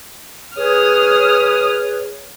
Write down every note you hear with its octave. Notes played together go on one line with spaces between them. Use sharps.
G#4 B4 C#5 D#6 F6